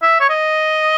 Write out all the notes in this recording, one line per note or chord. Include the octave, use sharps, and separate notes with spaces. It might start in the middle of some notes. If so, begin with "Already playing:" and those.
E5
C#5
D#5